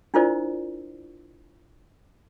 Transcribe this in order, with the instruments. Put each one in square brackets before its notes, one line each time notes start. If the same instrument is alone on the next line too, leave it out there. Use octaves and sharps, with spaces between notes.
[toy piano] D4 E4 F4 A#4 C5 D5